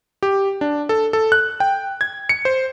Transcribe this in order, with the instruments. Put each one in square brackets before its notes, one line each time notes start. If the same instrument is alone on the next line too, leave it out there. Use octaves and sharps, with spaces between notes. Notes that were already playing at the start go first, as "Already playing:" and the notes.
[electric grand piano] G4
D4
A4
A4
F#6
G5
G#6
C#7
C5